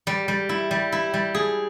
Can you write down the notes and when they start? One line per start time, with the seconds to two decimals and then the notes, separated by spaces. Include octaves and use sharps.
0.07 G3
0.28 G3
0.49 E4
0.71 G3
0.92 E4
1.14 G3
1.35 G#4